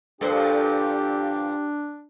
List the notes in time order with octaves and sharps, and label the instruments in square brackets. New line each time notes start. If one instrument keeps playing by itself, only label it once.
[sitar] G2 A#2 F3 [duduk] D4 [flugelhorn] G4 [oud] A4 A#4 C5